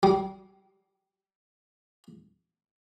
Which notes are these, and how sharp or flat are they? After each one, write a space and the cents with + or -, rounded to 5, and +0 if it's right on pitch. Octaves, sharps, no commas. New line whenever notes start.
G3 -30